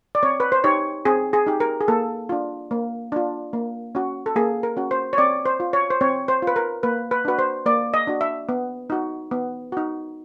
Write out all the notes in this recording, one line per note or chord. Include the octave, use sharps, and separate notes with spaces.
D5
C4 C#5
B4
C5
D#4 G4 C#5
C4 G#4
G#4
D#4 G4
A#4
G#4
A#3 A4
D4 F4
A#3
D4 F4
A#3
C#4 F#4
A4
A#3 G#4
A#4
C#4 F#4
C5
C#5
C4 D5
C5
F4
C#5
C5
C4 C#5
C5
F4 B4
A#4
A#3 B4
B4
D4 F#4 B4
C5
A#3 D5
D#5
D4 F#4
E5
B3
D#4 F#4
B3
D#4 F#4